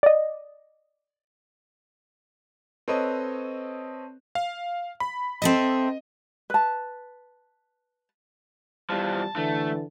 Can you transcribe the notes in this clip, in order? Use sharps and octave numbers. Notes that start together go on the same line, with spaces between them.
D5 D#5
C4 A4 B4 C#5 D#5
F5
B5
C4 A4 D#5 E5
B4 A5
E2 F3 G3 A5
D3 E3 A3